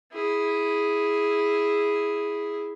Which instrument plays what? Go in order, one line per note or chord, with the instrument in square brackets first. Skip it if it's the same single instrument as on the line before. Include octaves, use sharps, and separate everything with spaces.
[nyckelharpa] E4 G#4